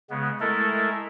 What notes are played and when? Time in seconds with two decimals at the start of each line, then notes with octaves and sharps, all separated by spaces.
0.10 C#3 G#3 B3
0.40 G#3 A3 E4 A4 A#4